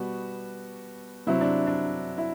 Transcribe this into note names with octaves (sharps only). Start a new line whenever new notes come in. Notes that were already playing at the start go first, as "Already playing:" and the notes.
Already playing: B2 G3 B3 F#4
C3 F#3 C4 E4
D4
D4
E4